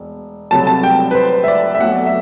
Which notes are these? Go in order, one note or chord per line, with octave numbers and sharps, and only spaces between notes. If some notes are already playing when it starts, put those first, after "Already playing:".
Already playing: E1
C2 C3 F#3 A3 A5
A5
G5
B4
C5
E5
D5
E5
B1 B2 F#3 A3 F#5
E5